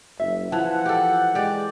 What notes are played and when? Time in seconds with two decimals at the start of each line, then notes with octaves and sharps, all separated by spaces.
0.20 F#1 E5
0.52 E3 F3 F#5 A5
0.85 G4 A4
1.35 G#3 G4 D5